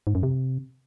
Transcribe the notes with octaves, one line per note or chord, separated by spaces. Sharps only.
G#2
F#2
C3